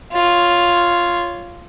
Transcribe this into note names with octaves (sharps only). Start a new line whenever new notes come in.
F4 C#5